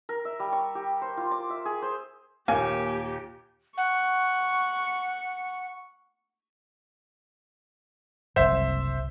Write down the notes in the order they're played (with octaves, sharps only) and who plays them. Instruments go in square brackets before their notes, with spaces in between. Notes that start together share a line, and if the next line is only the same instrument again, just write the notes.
[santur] A#4
E5
G3
C#6
G4
C5
F4
D6
E5
G#4
C5
[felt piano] D#2 A#2 [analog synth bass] A#3 [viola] G4 [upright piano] G#5
[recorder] F#5 [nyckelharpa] C#6
[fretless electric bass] F#1 C2 [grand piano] C5 E5